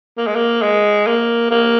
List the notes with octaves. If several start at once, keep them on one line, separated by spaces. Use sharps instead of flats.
A#3
G#3
A#3
G#3
A#3
A#3